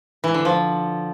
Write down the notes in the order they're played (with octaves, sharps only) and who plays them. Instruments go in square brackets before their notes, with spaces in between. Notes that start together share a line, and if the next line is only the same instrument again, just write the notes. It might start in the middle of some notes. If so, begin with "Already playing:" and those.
[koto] E3
D3
F3